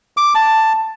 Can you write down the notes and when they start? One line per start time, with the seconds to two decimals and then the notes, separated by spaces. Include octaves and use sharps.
0.17 D6
0.35 A5